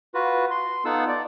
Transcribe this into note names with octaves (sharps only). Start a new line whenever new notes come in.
F4 F#4 B4
C6
B3 D#4 F4 A4 F#5 E6
D5